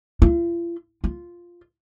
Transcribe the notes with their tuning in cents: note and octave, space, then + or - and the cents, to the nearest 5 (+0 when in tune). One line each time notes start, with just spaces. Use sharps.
F4 -45
F4 -5